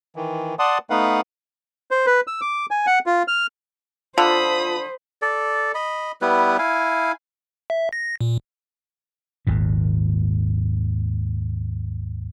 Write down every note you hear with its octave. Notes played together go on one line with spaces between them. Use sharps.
D#3 E3
D5 F#5 A5 C6 D#6
A3 B3 D#4 B4 F5 F#5
C5
B4
E6
D6
G#5
F#5
F4
F6
D3 F4 C5 A5 B5 D#6
A4 D5
D#5 B5
G3 B3 E4 B4
E4 F5 G#5
E5
A#6
A#2
G#1 D#2 A#2